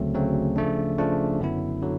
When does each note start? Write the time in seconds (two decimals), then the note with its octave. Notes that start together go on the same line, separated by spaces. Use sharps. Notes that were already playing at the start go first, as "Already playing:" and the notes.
Already playing: D2 C#3 F#3 A3 C4
0.15 D2 C#3 F#3 A3 C4
0.56 C#3 F3 A3 D4
0.98 C#3 F3 A3 D4
1.40 F#2 D3 F#3 B3 E4
1.82 D3 F#3